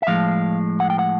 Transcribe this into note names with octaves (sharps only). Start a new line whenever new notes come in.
E5
A2 F3 G#3 F5
F#5
G5
F#5